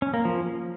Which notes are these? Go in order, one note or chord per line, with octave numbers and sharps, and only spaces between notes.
C#4
A#3
F3